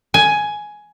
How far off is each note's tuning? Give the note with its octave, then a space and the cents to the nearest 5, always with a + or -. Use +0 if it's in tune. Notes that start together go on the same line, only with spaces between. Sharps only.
G#5 +10